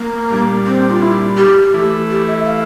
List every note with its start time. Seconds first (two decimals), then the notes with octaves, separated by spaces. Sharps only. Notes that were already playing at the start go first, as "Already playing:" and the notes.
Already playing: A#3
0.30 A#2 G3 D4
0.66 C4
0.90 F4
1.02 E4
1.37 G4
1.74 E3 A3 E4
2.10 G4
2.28 E5
2.46 F5